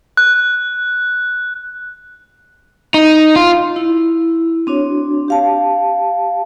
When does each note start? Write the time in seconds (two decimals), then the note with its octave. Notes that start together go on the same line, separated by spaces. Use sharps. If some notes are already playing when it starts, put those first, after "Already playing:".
0.17 F#6
2.94 D#4
3.36 F4
3.76 E4
4.67 C4 D4 F#4 C#5
5.28 G4 F5 A5